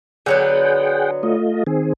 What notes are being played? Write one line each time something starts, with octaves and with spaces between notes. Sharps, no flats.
D3 F#3 B3 G#4 F#5 G5
A3 F4 D#5
D#3 C4 G#4